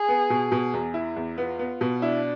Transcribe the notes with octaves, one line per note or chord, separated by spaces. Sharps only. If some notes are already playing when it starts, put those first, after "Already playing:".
Already playing: G#4
B3
B2
B2
E2
E4
E2
B3 F4
B3
B2
D4 E4